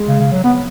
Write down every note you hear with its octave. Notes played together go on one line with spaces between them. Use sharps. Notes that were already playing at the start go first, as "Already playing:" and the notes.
Already playing: G#3
C#3
C#3
F#3
B3